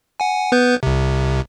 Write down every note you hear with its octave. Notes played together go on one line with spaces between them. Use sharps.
F#5 G#5
B3 B4 G6
C2 C3